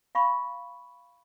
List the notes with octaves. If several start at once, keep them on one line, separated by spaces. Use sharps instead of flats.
F5 B5 C#6